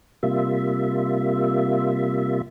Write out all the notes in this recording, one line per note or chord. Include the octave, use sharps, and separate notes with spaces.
C3 G3 A#3 F4 E5